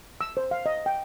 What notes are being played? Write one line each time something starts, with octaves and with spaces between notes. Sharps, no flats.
E6
C5
F5
D#5
G5